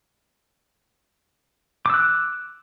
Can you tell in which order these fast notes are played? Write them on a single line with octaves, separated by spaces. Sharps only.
D6 E6 F#6